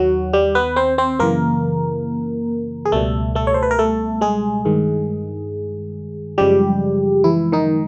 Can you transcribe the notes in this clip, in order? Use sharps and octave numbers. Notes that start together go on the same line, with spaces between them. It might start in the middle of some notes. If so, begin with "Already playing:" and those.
Already playing: D#2 D#3 F#3 F#4
G3 G4
B3 B4
C4 C5
C4 C5
F#2 C#3 E3 A#3 A#4
G#4
C#2 B2 G3 A3 A4
A3 A4
C#5
C5
B4
A#4
A3 A4
G#3 G#4
G2 D#3 G#3
F#2 C#3 F3 G3 G#3 G4
E3 E4
D#3 D#4